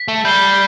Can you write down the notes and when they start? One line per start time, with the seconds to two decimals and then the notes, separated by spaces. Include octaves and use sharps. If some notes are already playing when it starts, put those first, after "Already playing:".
Already playing: B6
0.08 A3
0.25 G3 G6 C7 G7